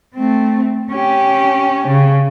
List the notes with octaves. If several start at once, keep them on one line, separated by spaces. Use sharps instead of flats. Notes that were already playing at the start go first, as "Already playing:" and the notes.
A3 C4
C#4 G4
C#3